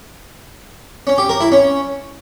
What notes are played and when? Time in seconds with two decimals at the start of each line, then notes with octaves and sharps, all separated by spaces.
1.07 C#4
1.18 G4
1.29 A#4
1.41 E4
1.52 C#4